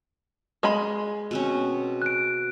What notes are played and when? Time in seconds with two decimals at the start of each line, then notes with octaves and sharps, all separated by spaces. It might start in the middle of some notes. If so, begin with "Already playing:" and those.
0.63 G#3 D#5 B5
1.31 B2 C4 C#4
2.02 F#6 D7